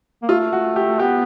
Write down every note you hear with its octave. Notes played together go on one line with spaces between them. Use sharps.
A#3
A3 F4
F#4
G4
B3 G4